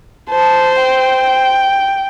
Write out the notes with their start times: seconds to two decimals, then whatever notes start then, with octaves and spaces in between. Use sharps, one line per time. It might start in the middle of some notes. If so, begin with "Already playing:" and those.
0.30 C5 A5
0.81 G5